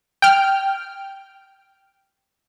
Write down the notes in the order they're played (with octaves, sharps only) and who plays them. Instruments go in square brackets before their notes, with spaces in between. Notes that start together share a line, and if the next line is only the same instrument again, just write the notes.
[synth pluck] G5 F6